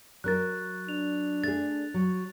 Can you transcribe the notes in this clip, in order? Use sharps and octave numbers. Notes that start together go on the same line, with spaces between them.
F#3 A#4 F#6 A6
D4 F7
A3 G#4 A6
F#3